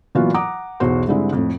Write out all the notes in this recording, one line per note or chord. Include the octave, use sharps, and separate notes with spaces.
A#2 E3 F#3 B3 F4 F#4
F#5 A#5 D6 D#6
B1 E2 B2 F#4 C5 C6
G#2 D3 G3 G#3 C4 E4
F2 A2